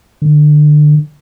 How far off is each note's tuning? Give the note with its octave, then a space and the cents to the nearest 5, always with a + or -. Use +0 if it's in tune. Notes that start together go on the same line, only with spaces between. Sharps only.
D3 +25